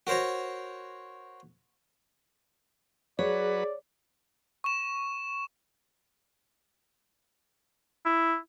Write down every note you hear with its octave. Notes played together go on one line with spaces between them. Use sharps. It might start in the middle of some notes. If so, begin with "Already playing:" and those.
F#4 A#4 C5 C#5 A#5
F#3 G#4 B4 C#5 D5
C#6 E7
E4